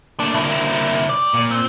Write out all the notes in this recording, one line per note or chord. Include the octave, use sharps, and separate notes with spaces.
A#2 A3 D4
C2 D3 A#3 E4
G3 D5
A#2
C4